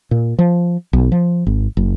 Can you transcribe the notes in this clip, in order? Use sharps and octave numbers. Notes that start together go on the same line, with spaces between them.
A#2
F3
B1
F3
G#1
F#1